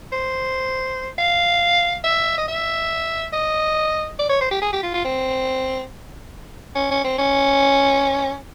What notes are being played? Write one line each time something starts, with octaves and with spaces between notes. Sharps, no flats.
C5
F5
E5
D#5
E5
D#5
D5
C#5
C5
G4
G#4
G4
F4
F4
C4
C#4
C#4
C4
C#4